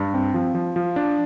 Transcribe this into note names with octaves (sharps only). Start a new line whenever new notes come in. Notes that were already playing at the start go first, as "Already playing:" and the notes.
Already playing: G2
C4
F3
F3
F3
D4